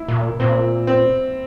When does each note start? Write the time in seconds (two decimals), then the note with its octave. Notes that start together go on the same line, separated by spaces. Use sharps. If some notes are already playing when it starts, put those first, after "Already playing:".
Already playing: E4
0.08 A#2
0.40 A#2 C4
0.87 C4